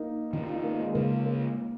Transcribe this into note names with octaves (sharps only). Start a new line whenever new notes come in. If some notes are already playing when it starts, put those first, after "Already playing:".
Already playing: A#3 D#4
D#3 C#4 D#4
F4
D#4
A#3
G#3
C#3 G#3 A#3 C#4
A#3